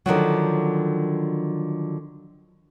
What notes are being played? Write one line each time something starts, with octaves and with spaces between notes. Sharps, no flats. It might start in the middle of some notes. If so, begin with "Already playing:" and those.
D3 D#3 F3 F#3